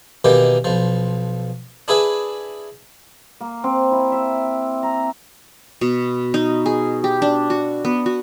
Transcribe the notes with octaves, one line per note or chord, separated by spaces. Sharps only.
B2 D#3 E3 A#3 G4
B1 F3
D4 E4 G#4 B4 E5
A#3
C4
E4
E5
A#5
B2
D#4
G#4
G4
D4
F#4
B3
F#4